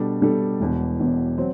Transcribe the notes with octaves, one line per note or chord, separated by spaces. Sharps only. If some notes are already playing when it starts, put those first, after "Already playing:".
Already playing: B2 G3 D4 A4
B2 G3 D4 A4
E1 E2 B2
E1 E2 B2
F#3 C4